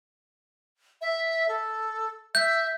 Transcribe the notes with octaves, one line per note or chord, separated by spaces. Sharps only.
E5
A4
E5 G6